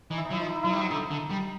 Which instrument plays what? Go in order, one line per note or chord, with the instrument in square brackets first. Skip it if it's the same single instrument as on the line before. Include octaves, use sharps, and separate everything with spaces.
[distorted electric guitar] E3 [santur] D#4
[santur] E4
D#4
[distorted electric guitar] F#3 [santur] E4
[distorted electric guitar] F3
[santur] D#4
E4
D#4
[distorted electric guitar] F#3 [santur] E4
[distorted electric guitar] G3 [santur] D#4
[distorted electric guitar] F#3
[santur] E4
[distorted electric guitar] D3 [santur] D#4
[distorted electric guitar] D3
G3